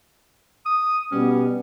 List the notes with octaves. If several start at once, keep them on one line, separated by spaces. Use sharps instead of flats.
D#6
B2 G3 B3 C#4